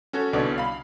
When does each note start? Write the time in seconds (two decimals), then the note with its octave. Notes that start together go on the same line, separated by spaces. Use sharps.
0.13 C#4 F#4 A4 C#5
0.33 C2 B2 D3 C#5 D5
0.58 F5 B5